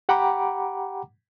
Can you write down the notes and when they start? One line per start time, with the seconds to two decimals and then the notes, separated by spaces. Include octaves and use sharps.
0.09 G4 F#5 G5 A#5 B5 D6